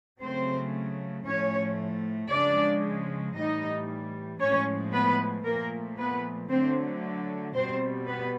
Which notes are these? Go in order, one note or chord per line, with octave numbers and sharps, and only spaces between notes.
C#3 F#3 A3 C4 C5
A2 F3 A3 C#4 C#5
C#3 F3 G#3 D4 D5
A2 E3 G3 D#4 D#5
A2 F3 G#3 C#4 C#5
B3 B4
A#2 F3 A3 A#3 A#4
B3 B4
D3 F#3 A3 C4 C5
B2 G3 C4 C5
B3 B4